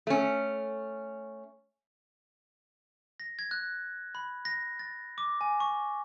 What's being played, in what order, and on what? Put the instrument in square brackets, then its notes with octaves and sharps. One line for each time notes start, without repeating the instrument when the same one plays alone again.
[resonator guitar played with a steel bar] A3 C#4
[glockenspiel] A#6
G#6
F#6
B5
A#6
A6
D6
G#5
C#6